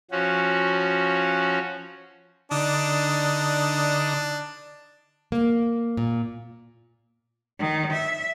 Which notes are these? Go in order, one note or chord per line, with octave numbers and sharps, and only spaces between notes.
F3 C#4 F#4
D3 D4 D#4
A#3
A#2
D#3
E5